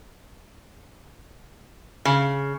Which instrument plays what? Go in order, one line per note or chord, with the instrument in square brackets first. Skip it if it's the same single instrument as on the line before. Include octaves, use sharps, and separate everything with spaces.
[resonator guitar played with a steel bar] C#3